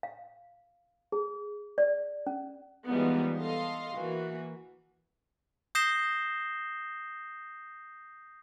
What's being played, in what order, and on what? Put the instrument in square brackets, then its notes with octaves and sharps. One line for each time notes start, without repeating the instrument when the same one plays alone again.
[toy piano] F5
G#4
D5
C#4
[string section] E3 F3 G3 G#3 B3 D#4
A4 D#5 F5 C6
E3 A#3 F#4
[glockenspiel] D#6 G6 A#6 C7 E7 G7